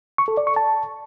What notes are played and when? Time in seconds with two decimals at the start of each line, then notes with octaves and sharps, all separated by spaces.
0.18 C#6
0.28 A4
0.37 D5
0.47 C#6
0.56 A5